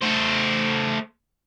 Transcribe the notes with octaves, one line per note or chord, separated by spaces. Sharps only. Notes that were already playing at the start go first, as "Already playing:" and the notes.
A3 C5